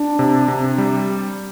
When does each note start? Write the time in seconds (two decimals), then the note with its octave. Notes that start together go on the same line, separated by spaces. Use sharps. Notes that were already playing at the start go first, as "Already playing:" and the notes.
Already playing: D4
0.19 C3
0.48 C3
0.78 G3